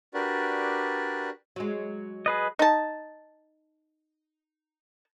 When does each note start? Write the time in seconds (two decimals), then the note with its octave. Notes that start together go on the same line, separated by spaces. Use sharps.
0.14 D4 F#4 G4 A#4 B4 D5
1.56 F#3 G#3
2.26 G#4 B4 D#5
2.59 D#4 A5